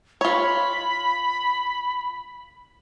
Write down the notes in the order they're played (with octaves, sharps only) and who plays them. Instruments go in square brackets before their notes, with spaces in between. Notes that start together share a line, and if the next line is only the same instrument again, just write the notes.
[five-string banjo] F4 C#5 [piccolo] B5